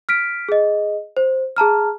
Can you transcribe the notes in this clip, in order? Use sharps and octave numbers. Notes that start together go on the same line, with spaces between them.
F6 B6 D7
G#4 D#5
C5
G#4 A5 A#5 F6